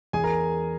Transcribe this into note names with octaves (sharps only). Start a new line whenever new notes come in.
E2 G#4 G#5
A#4 A#5